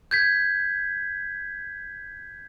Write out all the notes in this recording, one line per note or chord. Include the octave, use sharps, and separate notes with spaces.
G6 G#6 B6